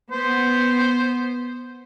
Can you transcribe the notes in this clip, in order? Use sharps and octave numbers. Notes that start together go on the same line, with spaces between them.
B3 C5